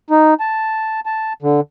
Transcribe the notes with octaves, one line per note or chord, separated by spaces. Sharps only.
D#4
A5
A5
D3